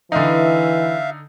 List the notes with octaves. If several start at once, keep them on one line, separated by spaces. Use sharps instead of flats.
D3 E3 D#4 E5 F5